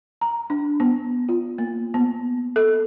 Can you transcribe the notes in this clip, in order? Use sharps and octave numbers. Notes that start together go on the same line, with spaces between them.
A#5
D4
B3
F4
A#3
B3
A4